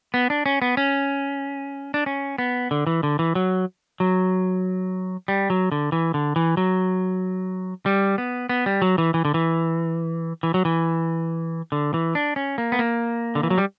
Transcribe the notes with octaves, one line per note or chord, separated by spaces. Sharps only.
B3
D4
C#4
B3
C#4
D4
C#4
B3
D3
E3
D3
E3
F#3
F#3
G3
F#3
D3
E3
D3
E3
F#3
G3
B3
B3
G3
F#3
E3
E3
D3
E3
E3
F#3
E3
D3
E3
D4
C#4
A#3
B3
A#3
D3
E3
F#3
G3